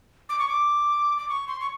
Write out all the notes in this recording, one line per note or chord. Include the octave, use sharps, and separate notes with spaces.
D6
C#6
D6
D6
C#6
C6
C#6